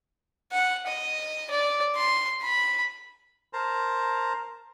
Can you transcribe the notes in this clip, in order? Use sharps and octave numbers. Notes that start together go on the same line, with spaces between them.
F#5
D#5
D5
C6
B5
A#4 C5 A5 A#5